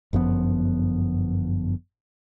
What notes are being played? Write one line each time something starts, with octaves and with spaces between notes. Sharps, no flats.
G1 F#2 F3 B3